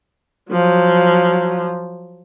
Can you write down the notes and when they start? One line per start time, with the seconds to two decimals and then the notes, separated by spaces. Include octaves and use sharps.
0.51 F3 F#3